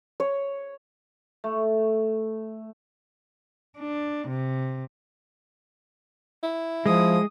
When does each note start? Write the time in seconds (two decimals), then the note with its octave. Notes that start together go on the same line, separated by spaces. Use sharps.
0.20 C#5
1.44 A3
3.78 D4
4.27 C3
6.43 E4
6.86 F3 G#3 D#6